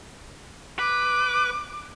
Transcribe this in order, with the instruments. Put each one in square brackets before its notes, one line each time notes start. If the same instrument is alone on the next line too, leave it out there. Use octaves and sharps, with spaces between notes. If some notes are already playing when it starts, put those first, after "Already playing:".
[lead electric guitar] B4 [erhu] D6